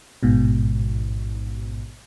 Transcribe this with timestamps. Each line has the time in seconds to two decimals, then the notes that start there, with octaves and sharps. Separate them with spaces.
0.23 A1 G#2 B2